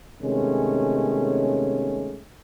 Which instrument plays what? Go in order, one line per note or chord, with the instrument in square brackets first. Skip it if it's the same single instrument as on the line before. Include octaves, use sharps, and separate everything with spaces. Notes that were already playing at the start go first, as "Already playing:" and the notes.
[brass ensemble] C3 D#3 G#3 A3 B3 C#4